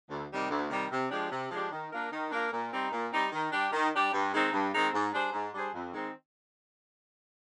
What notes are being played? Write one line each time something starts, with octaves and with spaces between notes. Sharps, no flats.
D2
C3 D#3 G3
D2
C3 D#3 G3
C3
F3 G#3 D4 G4
C3
F3 G#3 D4 G4
D#3
A#3 D4 F4 A#4
D#3
A#3 D4 F4 A#4
A#2
G3 C4 D#4
A#2
G3 C4 D#4
D#3
G3 D4 G4
D#3
G3 D4 G4
G2
D#3 G#3 C4 D#4
G2
D#3 G#3 C4 D#4
G#2
G3 D4 G#4 C5
G#2
G3 D4 G#4 C5
F2
D#3 G#3 C4 D#4